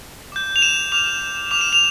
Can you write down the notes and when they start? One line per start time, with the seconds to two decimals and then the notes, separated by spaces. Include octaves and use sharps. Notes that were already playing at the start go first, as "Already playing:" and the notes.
0.32 D6 G6
0.56 F7
0.62 E7
0.92 D6 F6 F7
1.51 D6 F6 F7
1.61 E7
1.73 F7